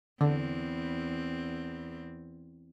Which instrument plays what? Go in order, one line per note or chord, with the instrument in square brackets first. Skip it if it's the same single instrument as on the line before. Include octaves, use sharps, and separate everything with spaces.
[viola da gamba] E2 C4 [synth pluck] D3